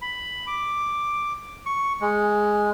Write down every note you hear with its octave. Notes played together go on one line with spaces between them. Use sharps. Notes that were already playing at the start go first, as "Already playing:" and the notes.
B5
D6
C#6
G#3